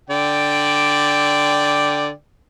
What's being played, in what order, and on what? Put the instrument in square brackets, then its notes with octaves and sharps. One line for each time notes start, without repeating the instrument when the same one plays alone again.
[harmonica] D3 D5 G5